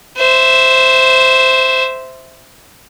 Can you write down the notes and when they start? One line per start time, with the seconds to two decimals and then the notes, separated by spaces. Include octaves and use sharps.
0.16 C5 E5